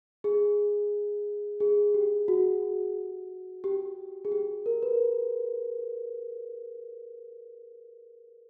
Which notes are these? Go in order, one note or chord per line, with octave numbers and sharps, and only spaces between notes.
G#4
G#4
G4
F#4
G4
G#4
G4
A#4
B4